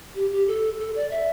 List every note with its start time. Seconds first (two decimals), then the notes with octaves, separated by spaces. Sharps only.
0.15 G4
0.32 G4
0.47 A4
0.79 A4
0.95 D5
1.11 E5